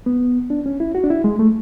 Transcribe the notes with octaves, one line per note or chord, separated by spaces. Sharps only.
B3
D4
C#4
E4
F#4
D4
E4
G#3
A3